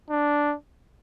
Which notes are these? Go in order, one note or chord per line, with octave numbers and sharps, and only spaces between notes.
D4